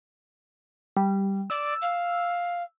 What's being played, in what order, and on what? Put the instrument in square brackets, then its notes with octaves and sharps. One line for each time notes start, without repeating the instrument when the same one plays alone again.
[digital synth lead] G3
[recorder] D5 [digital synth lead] E6
[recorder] F5